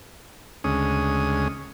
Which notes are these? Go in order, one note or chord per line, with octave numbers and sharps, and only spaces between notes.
D2 C#3 G#3 C#4 D#6